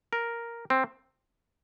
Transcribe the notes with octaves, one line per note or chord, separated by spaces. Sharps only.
A#4
C4